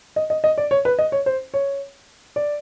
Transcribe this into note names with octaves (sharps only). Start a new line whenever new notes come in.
D#5
D#5
D#5
D5
C#5
B4
D#5
C#5
C5
C#5
D5